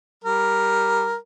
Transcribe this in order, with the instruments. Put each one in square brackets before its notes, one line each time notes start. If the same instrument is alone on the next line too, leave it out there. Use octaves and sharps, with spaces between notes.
[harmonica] G3 A#4